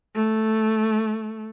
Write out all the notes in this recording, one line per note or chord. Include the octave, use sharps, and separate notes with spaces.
A3